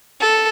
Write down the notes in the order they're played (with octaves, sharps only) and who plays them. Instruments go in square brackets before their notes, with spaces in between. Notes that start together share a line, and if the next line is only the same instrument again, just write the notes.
[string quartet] A4